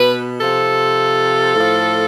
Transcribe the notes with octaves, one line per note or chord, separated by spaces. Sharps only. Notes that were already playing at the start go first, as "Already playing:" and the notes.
Already playing: B2 B4
C3 F3 A4
A2 F3